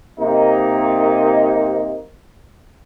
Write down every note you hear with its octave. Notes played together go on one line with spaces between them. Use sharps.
C3 A#3 D#4